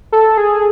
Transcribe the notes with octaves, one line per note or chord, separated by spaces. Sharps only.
A4
G#4